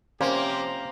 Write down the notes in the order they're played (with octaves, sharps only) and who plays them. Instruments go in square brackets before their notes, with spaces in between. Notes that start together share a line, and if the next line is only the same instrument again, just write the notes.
[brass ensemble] C3 F3 G4 [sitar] A#3 [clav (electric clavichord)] C#4 [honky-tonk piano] C5